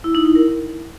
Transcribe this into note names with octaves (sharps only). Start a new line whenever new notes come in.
E4
D#4
E4
A#4